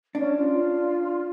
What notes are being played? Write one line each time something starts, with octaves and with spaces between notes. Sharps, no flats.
C#4 D4
F4